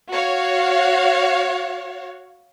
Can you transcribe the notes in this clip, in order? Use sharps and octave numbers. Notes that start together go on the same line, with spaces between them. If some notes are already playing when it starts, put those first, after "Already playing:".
F#4 C#5 F5